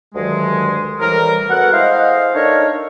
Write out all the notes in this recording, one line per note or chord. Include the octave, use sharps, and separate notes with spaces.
D2 G2 D#3 F#3 G#3
C2 A2 E3 G3 A#4
B3 F#4 A4 A#4 F#5
G#3 E4 C5 D#5 F5
D4 D#4 A4 A#4 C#5